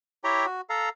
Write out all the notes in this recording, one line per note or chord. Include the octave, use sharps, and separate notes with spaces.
E4 G4 C#5 E5 G5 A#5
F#4
A4 F5 A#5